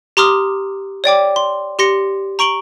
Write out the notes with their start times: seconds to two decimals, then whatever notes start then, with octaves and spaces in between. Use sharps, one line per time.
0.17 G4 A#5 C6 D6 D#6 F6
1.04 C#5 D5 G5 D6
1.36 C6
1.79 G4 C6 A#6 C#7
2.39 A#5 C#6 D7 F#7 G7